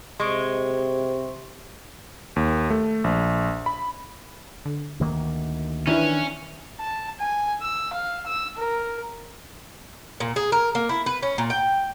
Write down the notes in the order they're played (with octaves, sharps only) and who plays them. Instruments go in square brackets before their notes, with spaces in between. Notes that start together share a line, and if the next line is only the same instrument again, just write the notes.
[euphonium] C3 [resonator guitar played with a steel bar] G#3 [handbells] C6 C#6 D7
[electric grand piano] D#2
A3
A#1
B5
[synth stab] D3
[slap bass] D2 D#3 A#3
[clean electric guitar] D#3 D4 [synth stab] E3 E4 [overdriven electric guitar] C#4
[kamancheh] A5
G#5
E6
F5
E6
A#4
[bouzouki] A#2
G#4
A#4
A#3
E4
B4
C#4
A#2
G5